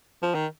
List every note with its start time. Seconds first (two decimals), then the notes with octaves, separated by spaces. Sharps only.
0.23 F3
0.35 D#3